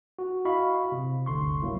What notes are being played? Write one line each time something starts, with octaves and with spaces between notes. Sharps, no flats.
F#4
E4 F#4 D#5 F5 B5 C#6
C3
G1 D2 D3 C6 C#6
A2 F#3 A#3 E4